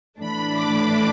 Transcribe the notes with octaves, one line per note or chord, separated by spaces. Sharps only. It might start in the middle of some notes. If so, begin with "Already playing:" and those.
A2 E3 A3 D4 B5
D6